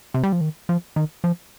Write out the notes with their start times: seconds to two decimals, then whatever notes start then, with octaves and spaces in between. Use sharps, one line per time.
0.14 C3
0.23 G3
0.33 F3
0.41 D#3
0.69 F3
0.96 D#3
1.24 F3